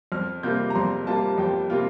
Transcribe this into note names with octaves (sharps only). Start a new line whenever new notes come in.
F2 F6
C3 G3 A#3 F4 G6
A#5
F2 C6
C3 G3 A#3 F4 A5
F2 G5
C3 G3 A#3 F4